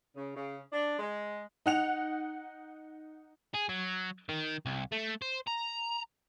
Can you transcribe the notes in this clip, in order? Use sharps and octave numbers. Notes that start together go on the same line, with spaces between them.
C#3
C#3
D4
G#3
D#4 F#5 F7
G#4
F#3
D#3
C2
A3
C5
A#5